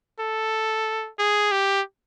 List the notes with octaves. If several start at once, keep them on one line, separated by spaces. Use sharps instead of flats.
A4
G#4
G4